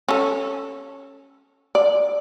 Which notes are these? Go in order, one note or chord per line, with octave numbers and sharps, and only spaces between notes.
C#4 A4
D5